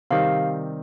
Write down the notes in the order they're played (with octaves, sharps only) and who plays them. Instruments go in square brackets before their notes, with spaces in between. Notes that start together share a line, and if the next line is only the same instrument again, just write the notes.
[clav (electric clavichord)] C3 D#3 G3 C4 [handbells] F5